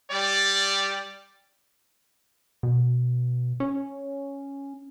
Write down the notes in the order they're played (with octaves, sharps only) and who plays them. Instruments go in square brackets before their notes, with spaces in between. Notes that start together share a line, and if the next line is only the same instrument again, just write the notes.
[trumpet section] G3 D5
[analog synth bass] B2
C#4